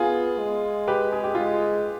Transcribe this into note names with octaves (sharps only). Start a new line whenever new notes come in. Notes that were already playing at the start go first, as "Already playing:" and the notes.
Already playing: B3 F4 G#4
G#3
G4 B4
G#4
G4
G#3 F4 G#4